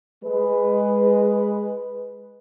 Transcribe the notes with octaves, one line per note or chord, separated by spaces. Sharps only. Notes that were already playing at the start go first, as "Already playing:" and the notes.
G#3 B4